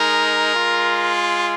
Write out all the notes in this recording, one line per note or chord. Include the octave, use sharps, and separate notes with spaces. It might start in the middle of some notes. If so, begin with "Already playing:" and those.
Already playing: G#3 D#4 A#4
G#3 F4